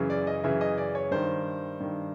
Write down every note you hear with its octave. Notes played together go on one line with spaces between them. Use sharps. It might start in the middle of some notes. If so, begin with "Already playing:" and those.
Already playing: F#2 C#3 E3
D5
D#5
F#2 C#3 E3 E5
D#5
D5
C#5
G2 D#3 C5
G2 D#3